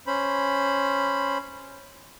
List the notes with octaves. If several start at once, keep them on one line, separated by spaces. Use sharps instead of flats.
C#4 C5 B5